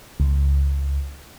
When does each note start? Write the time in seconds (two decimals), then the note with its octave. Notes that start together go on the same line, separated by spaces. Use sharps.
0.20 C#2